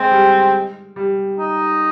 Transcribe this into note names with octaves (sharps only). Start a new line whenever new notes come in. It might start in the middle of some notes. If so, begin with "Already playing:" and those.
Already playing: G#3 C4
G3
G3
D#4